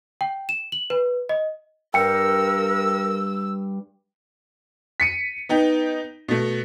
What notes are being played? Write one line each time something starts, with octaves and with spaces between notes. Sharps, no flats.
G5
E7
F#7
B4
D#5
G2 A#4 G5 E6 C#7
B6 C#7 D#7
B3 D#4 G5
B2 A3